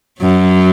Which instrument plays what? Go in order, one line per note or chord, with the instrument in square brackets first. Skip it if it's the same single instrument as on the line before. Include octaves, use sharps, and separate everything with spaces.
[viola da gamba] F#2 F#3